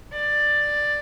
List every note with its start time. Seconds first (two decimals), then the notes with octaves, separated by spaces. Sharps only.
0.12 D5